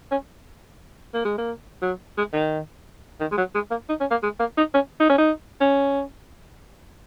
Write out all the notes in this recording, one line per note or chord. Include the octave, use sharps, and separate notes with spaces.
C#4
A#3
G#3
A#3
F#3
G#3
D#3
D#3
G#3
F#3
G#3
A#3
D#4
C#4
A#3
G#3
A#3
D#4
C#4
D#4
C#4
D#4
C#4